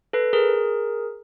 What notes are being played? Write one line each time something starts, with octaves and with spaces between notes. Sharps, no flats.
A4 B4
G#4 A#4